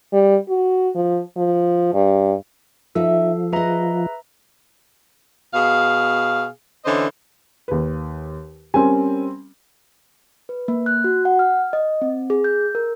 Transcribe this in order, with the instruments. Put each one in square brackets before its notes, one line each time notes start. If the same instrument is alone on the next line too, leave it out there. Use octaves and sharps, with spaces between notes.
[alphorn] G3
F#4
F3
F3
G2
[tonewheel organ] F3 [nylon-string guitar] D#4 B4 E5 [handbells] A4
[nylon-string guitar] G#4 D#5 [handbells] B4 E5 A#5
[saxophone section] B2 G#4 F5
D3 E3 C#4 C5 D#5
[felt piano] D#2 B4
[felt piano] G3 C4 [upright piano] C#4 A#4 G#5
[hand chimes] B4
A#3
F#6
F#4
F#5
F6
D#5
C4
G#4
G6
A#4